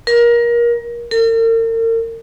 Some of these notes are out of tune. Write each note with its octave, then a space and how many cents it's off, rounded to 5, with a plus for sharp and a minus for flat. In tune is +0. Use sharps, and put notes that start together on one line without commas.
A#4 +25
A#4 -40